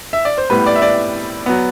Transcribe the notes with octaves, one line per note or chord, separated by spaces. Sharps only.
E5
D5
C5
A2 G3 B3 B4
D5
E5
D5
F#3 B3